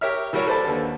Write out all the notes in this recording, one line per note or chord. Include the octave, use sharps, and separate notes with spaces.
G4 A#4 C#5 E5 F6
E3 G3 F#4 A#4 C#5
A4 B4 C5 D5 A5
D#2 D3